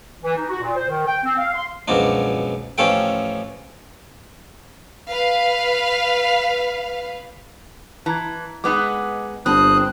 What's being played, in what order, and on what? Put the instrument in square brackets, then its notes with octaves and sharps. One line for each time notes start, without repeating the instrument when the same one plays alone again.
[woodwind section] E3
D#4
F#4
A#2
C5
D#3
G5
C4
F5
C6
[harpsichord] C#2 F#2 B2 F3 D4
A1 F3 C#4 F4 A4 G5
[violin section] B4 F5
[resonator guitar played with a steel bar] E3 [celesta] A5 A#5 G#6
[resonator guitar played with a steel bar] G#3 B3 D#4 [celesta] D6 D#6
[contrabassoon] G1 [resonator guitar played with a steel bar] C4 [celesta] A5 B5 [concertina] D#6 F#6